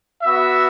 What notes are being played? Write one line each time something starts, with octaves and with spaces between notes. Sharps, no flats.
B3 F#4 E5